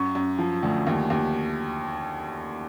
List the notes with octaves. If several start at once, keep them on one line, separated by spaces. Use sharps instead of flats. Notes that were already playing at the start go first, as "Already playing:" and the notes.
Already playing: F#2 C#6
F#2
F3
D2
D#2
D#2